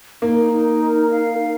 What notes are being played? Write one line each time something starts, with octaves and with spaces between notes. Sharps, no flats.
A#3 D#4
D#4
A#4
F5
D#4